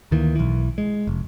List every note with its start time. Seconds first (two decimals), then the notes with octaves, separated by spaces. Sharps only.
0.11 D2 D#3 E3 A#3
0.35 B1 E3
0.78 G#3
1.07 F1